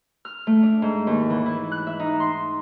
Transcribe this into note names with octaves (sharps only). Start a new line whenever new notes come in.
F6
A3
D4
G#2
D#2
E3
E4
F#6
E5
D#4
C6